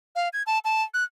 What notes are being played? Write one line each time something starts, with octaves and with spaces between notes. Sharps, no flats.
F5
G#6
A5
A5
F#6